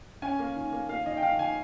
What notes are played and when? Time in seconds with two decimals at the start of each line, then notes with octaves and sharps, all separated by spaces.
0.22 C#4 G#5
0.39 A#3
0.56 D#3
0.73 A#3
0.89 A#3 F5
1.06 D#3 D#5
1.17 G5
1.23 D#3 F5
1.39 D#3 G#5